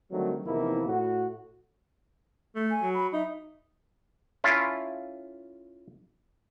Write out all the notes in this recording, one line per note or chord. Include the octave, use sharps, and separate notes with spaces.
D3 D#3 F#3 G3 A3 C4
E2 C3 D#3 F3 A#3 E4
A2 F#4
A3
G#5
F#3
B5
D#4 E5
C#4 E4 F4 A4